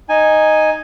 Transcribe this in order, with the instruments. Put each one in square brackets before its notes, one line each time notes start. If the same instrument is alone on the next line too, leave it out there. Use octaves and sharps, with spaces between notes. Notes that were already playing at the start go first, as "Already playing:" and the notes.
[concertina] D#4 G#5